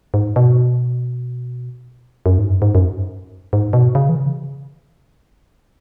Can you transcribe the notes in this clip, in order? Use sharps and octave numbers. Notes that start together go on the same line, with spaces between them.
G#2
B2
F#2
G#2
F#2
G#2
F#2
G#2
B2
C#3
E3
C#3